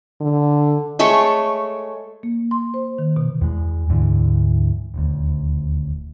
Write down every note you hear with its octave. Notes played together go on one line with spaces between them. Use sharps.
D3
G#3 A3 A4 C#5
A#3
C6
C5
D#3
B2
E2 G#3
D2 G#2 D3 E3
D#1 D2